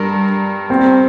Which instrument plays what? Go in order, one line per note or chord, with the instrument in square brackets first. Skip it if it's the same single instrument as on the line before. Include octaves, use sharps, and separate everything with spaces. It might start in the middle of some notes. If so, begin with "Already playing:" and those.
Already playing: [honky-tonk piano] G2 A#4 [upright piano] G3
[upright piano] C4